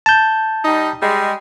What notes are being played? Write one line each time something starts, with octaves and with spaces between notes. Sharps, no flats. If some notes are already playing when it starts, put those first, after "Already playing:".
A5 G6
G3 D#4
G3 G#3